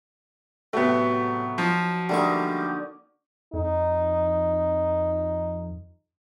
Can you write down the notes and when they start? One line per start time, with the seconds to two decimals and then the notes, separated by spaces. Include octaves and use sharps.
0.73 A2 C3 F#3 A3 B3
1.58 F3 D#4
2.09 D3 G3 A3 A#3 D#4 C#6
3.53 F2 D#4